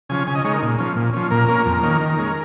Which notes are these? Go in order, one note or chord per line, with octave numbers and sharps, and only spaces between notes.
C#3 F3 C#4 G#5
C#3 G#5
D#5
G#3 D#4 C#5
A#4
A#2
F3 C#4
A#2
F3 C#4
A#2 A#4
A#3 C#4
F2
D#3 A#3 C#4
D#3
G#3 C#4